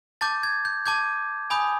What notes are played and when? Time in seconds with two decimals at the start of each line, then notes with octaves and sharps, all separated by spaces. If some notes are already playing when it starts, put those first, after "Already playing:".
0.21 A5 D6 G6 A6
0.43 G#6
0.65 G6
0.86 A5 D6 G6 G#6
1.50 G#5 B5 D#6 G6